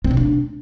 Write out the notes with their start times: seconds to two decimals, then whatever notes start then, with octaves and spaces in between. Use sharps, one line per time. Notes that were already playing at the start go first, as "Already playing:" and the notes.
0.04 C4
0.11 C3
0.17 D4